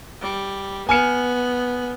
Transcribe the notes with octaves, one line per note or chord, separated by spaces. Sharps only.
G3
B3 G#5 F6 C#7